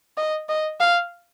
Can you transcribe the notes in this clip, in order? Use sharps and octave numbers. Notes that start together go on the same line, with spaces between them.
D#5
D#5
F5